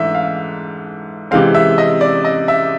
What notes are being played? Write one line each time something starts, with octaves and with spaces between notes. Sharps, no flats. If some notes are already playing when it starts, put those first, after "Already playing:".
Already playing: G#2 E3 A3 D4 E5
F5
C3 E3 G#3 C4 F5
E5
D#5
D5
D#5
E5